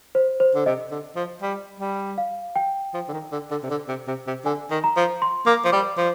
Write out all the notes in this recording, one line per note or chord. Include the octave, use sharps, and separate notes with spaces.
C5
C5
D3
C3 D#5
D3
F3
G3
G3
F5
G5
F3
D3
D#3
D3
D3
C3
D3
C3
C3
C3
D3 G#5
D#3
A#5
F3
C6
A#3 D6
F3
G3 D6
F3